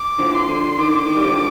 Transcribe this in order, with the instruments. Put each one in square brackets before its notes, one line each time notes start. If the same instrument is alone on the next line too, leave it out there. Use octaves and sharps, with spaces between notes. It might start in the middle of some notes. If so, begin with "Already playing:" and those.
Already playing: [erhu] D6
[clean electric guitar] D3 F3
[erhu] C6
[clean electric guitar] D3
[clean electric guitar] D#3 [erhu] D6
[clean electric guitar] D3
D#3
G3
D3 F3